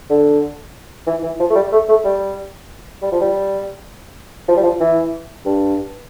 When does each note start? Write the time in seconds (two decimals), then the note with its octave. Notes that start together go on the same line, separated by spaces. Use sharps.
0.10 D3
1.07 E3
1.23 E3
1.40 F3
1.50 A3
1.56 G3
1.72 A3
1.89 A3
2.05 G3
3.02 G3
3.12 F3
3.21 G3
4.49 F3
4.57 G3
4.64 F3
4.80 E3
5.46 G2